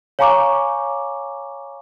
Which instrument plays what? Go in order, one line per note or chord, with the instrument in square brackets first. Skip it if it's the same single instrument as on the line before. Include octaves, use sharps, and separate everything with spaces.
[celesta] C#5 F5 G#5 A#5 C#6 D6